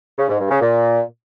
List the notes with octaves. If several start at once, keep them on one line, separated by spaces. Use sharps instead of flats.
C#3
G#2
G2
C#3
A#2